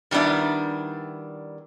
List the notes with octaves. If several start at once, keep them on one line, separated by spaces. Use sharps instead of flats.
D#3 G3 B3 D4 E4